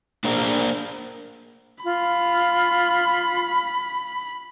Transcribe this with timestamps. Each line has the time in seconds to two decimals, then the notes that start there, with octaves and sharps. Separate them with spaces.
0.24 A#3 D4 G#4 A#4 C5 D5
1.84 F4 B5